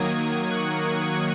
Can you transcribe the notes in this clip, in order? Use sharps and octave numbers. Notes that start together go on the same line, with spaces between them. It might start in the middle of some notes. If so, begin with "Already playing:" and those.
Already playing: D#3 F#3 A#3 D#6 G#6
C#6 F#6